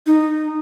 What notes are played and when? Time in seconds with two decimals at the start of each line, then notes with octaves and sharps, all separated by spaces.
0.07 D#4